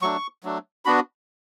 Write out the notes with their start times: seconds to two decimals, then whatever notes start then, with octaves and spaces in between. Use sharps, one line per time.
0.02 F#3 A3 D4 C#6
0.44 F#3 A3 D4
0.85 B3 D4 F#4 B5